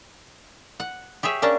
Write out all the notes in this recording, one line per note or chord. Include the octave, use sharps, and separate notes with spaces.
F#5
G4 G#4 C#5 E5
A#3 C#4 D4